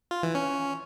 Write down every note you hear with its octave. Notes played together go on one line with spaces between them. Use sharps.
F4
E3
C#4